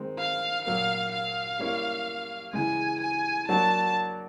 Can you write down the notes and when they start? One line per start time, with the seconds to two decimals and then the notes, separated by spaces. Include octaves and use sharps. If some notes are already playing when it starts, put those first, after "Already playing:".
Already playing: D#3 G#3 C4 D#4
0.19 F5
0.65 A#2 F#3 A#3 F5
1.12 F5
1.59 G3 A#3 C#4 E4
2.53 C#3 E3 G#3 G#5
3.01 G#5
3.48 F#3 A#3 D4 F#4 A5